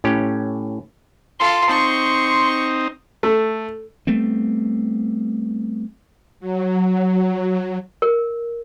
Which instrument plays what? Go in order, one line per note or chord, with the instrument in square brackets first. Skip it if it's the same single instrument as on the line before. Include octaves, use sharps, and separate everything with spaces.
[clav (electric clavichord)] A2 C#4 G4
[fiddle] F4 A4 [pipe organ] C6
[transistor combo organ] C4 D#4 [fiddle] C#6
[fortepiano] A3
[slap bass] G3 A3 B3 C4
[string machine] F#3
[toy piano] A#4